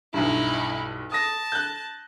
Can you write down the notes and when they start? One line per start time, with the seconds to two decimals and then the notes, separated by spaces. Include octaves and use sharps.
0.14 B1 G2 D#4 E4
1.12 A5 D#6 A#6
1.52 F#6 G6